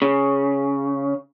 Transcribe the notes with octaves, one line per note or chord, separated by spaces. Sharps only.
C#3